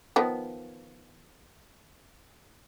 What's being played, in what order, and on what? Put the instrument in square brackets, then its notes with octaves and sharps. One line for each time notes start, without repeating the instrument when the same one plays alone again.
[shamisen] D#3 F3 B3